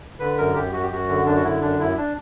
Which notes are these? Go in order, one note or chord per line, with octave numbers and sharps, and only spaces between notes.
D3 B4
F#2 A#4
F#2 G4
F#2 F#4
G4
F#2 F#4
D3
F#2 D4
F#4
D3 E4
F#2 D4
F#2 E4
D4